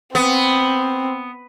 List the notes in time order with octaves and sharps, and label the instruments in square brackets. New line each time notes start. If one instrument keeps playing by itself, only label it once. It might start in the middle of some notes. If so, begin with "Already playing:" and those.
[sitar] B3 [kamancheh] C4